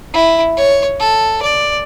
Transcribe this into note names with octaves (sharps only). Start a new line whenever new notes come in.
E4
C#5
A4
D5